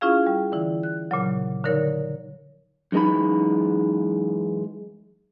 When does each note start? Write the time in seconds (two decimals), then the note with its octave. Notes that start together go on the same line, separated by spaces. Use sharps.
0.01 C#4 E4 F4 G#4 F5
0.27 G3
0.52 D3 E3 E4
0.83 F#6
1.11 A#2 C#3 F#3
1.64 D3 F3 D#4 A#4 C#5
2.92 F#2 E3 G#3 D#4 B5